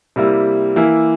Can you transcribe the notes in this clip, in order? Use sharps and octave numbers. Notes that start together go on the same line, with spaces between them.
C3 G3 A#3 E4
E3 A#3 E4